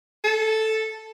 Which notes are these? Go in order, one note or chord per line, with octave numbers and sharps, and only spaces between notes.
A4